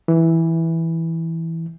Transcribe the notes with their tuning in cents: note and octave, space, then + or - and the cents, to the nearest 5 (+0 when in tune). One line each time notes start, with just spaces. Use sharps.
E3 -5